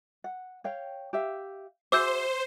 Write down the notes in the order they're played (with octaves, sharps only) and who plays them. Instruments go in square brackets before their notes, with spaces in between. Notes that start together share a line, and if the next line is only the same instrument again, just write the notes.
[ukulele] F#5
C#5 F5 G5
G4 E5 F5
[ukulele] F#4 G#4 E5 [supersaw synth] C5 [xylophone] D6 E6 G6